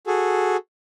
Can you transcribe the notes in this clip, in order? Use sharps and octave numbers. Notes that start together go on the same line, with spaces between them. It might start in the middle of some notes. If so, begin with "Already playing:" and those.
F#4 G#4 A4